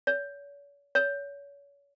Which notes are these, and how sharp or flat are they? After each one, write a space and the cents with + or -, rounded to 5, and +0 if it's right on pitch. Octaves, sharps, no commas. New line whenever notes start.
C#5 +45
C#5 +35